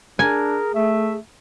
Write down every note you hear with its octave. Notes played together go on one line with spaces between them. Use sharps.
D4 G#4 A#4 G#5
A3 E5